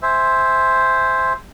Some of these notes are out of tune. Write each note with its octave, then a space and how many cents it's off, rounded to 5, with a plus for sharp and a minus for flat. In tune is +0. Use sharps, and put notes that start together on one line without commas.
C5 +0 E5 +0 G#5 +0